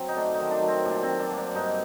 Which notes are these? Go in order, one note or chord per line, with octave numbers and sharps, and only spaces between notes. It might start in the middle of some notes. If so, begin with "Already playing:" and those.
Already playing: F#3 C4
D#4
A3 D4
D#4
D#3
D4
F#3
C4
A#2 D4
C4
F#3
D4
A#3
D4
G2 D#4